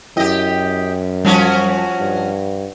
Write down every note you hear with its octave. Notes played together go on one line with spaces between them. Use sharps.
F#2 E4 G4 D#5 G5
F3 G3 C#4 F#4
G2